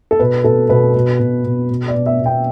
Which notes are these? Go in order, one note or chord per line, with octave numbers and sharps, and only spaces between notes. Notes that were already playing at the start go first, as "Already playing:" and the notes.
A4
B2 B4
B2 A4
B2 B4
B2
B2
B2
B2
D5
B2
E5
B2
G5